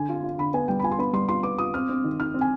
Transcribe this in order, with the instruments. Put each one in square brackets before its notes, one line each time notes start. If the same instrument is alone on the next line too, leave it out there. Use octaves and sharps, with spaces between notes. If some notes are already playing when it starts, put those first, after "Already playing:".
Already playing: [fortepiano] D3 [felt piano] G#5
[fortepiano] F4
F4
[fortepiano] D3 [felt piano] B5
[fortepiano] B3 [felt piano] G#5
[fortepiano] G3 [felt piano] G5
[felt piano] B5
[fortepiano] F4 [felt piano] G#5
[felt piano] C6
[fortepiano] B3 [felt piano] B5
[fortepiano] G3 [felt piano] C6
[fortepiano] F4 [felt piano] C6
[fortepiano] B3 [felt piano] D6
[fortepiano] F4 [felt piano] D#6
[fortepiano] C4 [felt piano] F6
[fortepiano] C4
D#3
[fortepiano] D#3 [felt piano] F6
[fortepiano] C4
[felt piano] G#5